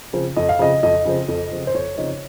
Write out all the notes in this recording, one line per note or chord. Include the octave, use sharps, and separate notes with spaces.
C#3 F3 C4
F2 D#5
F5
C#3 F3 C4 D#5
F2 D#5
C#3 F3 C4
F2
C#3 F3 C4
C5
F2 C#5
C#3 F3 C4 D#4